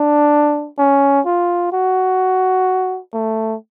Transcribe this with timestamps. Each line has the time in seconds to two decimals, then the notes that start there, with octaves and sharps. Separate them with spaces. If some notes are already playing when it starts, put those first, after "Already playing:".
Already playing: D4
0.78 C#4
1.26 F4
1.73 F#4
3.14 A3